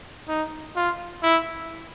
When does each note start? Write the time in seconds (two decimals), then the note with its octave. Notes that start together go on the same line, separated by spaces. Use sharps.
0.28 D#4
0.76 F4
1.23 E4